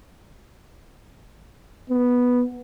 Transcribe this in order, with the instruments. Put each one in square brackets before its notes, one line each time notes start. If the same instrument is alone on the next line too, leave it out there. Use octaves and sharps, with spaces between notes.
[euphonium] B3